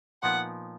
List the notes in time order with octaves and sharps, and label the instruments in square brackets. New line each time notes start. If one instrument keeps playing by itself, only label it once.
[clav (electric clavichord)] A#2 F3 B3 D#4 A#4 [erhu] F#5